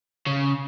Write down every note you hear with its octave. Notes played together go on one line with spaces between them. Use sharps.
C#3